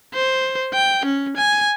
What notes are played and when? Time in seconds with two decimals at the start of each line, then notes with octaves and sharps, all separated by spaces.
0.14 C5
0.74 G5
1.05 C#4
1.37 G#5